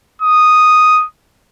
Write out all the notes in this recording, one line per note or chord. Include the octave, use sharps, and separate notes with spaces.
D#6